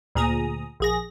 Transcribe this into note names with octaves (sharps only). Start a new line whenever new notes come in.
D2 A#2 G#4 A#5 D#6
A#1 G#4 A#6